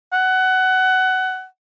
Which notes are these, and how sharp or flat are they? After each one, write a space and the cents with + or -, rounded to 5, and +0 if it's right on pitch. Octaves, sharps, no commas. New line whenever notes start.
F#5 +15